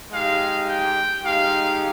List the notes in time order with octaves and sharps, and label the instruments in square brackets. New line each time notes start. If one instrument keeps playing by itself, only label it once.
[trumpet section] G#3 D#4 G4 F5
G5
G#3 D#4 G4 F5